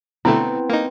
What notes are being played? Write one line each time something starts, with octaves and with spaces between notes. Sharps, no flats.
B2 D3 A3 B3 C4 E4
A#3 D#4